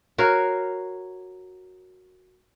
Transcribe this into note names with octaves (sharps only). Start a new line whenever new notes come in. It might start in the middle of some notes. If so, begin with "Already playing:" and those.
F#4 A#4 C#5 F5